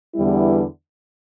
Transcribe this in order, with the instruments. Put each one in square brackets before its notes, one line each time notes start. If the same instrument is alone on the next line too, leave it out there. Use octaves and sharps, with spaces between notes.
[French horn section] E2 D3 G3 B3 E4